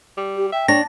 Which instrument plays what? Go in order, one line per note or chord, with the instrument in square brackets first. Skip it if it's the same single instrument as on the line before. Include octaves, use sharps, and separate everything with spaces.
[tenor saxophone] G3
[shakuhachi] G4
[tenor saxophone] E5 [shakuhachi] G5
[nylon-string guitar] D4 [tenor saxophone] C#5 [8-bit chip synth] A#6